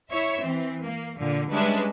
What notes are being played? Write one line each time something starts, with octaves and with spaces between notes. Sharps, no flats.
E4 C#5 E5
E3 C4
A#3
A#2 D3
G3 G#3 C#4 D4 B4 E5